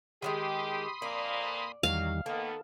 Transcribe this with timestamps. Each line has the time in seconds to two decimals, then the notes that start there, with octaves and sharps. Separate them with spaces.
0.22 D#3 F#3 G#3 G4 B5 C6 D#6
1.02 F2 A#2 A#3 D5
1.83 E2 D#3 F#3 G3 F5
2.26 D#3 A#3 B3 A4